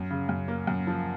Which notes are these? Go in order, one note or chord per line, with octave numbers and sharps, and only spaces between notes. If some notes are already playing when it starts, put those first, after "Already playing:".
Already playing: F#2
C#3
F#2
A#3
F#2
F3